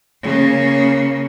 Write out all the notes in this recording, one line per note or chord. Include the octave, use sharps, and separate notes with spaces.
C#3 A#3